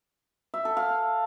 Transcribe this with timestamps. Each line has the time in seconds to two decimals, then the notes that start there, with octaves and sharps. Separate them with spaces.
0.54 E5
0.65 A4
0.77 F5